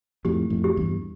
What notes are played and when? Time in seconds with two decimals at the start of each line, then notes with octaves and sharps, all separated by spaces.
0.25 F2 A2 G4
0.50 F2 A2
0.64 G4
0.77 E2 G2